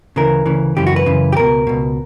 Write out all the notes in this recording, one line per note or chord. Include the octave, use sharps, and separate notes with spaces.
D2 C#3 E3 A#4
D2 C#3 E3
F#2 C#3 E3 G4
F#4
B4
F#2 C#3 E3
G4
C#2 B2 A#4
C#2 B2